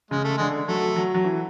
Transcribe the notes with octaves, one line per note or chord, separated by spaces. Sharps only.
C#3 G#3
A3
D3 G#3
F#3 A3
F#3
F#3
E3